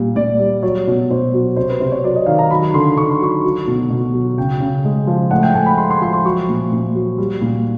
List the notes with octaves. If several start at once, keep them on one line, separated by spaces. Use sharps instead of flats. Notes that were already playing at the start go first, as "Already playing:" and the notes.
Already playing: A#2 G3
A#2 D5
G3
F#3 C#5
B2
B2 C5
F#3
C3 C5
B4
C3 C5
C#5
F#3 D5
D#5
D#3 F5
A#5
F#3 B5
D3 C6
D3 C#6
C6
F#3 C#6
F#3
B2
B2
F#3
C#3 G5
C#3
G#3
F3
A2 F#5
G5
A2 G#5
B5
G#3 C6
C6
F3 C6
C6
F#3 C#6
A#2
A#2
F#3
G3
A#2